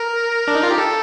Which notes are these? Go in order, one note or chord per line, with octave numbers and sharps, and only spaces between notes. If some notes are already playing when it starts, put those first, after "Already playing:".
Already playing: A#4
D4
D#4
F4
G4
A4